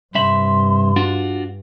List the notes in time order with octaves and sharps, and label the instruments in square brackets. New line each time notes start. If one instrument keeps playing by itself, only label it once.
[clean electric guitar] C2 E5 B5 [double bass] G2 [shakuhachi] C6
[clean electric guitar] D4 F4 F#4